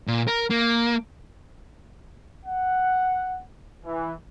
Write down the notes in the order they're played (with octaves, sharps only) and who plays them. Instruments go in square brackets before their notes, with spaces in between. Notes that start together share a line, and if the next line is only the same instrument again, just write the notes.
[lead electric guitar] A#2
A#4
A#3
[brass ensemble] F#5
E3